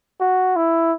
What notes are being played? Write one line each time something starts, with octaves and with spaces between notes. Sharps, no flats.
F#4
E4